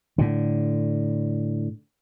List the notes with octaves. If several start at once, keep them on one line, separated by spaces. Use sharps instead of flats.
A2 D3